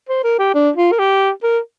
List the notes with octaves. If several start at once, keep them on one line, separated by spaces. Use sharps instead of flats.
C5
A#4
G4
D4
F4
A#4
G4
A#4